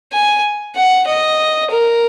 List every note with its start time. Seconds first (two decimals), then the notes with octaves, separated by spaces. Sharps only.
0.13 G#5
0.76 F#5
1.07 D#5
1.71 A#4